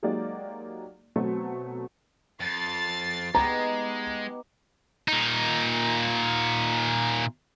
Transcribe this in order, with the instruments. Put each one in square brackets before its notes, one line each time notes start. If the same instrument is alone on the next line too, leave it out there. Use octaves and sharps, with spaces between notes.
[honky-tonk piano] F#3 G#3 A#3 D#4 G4 D5
B2 F#3 A3 C4
[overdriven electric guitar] F2 [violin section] A6 C7
[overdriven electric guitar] G#3 [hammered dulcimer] B3 D#4 G4 [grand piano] A#5
[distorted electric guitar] A#2 D#4